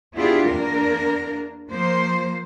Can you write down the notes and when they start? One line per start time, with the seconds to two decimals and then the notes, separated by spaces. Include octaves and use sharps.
0.15 B3 D4 E4 F4 G4 G#4
0.47 E2 A#3 D4 A#4
1.68 F3 A#3 C5